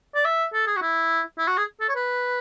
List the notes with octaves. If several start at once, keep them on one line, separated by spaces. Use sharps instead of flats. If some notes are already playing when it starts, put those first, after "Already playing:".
D5
E5
A4
G#4
F#4
E4
E4
F#4
G#4
A4
C#5
B4